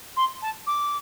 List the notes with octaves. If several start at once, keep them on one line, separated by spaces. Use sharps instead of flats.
C6
A5
D6